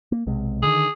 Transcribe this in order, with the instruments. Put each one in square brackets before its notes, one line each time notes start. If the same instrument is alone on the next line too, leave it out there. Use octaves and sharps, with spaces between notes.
[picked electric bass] A#3
B1 C3 G#3
[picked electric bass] D3 D#3 [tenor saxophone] G#4